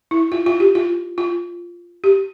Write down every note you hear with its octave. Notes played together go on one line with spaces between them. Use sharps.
E4
F4
F4
G4
F4
F4
G4